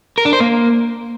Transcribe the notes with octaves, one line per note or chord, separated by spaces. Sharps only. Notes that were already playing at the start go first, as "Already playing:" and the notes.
A#4
D4
C5
A#3